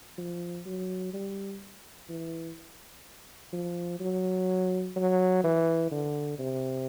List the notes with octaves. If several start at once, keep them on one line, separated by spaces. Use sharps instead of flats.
F3
F#3
G3
E3
F3
F#3
F#3
E3
D3
C3